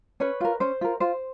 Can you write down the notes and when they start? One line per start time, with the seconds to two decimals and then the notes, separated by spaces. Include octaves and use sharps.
0.20 C#4 B4 C#5
0.41 F4 A#4
0.60 C#4 C5
0.81 F4 A#4
1.00 F4 C5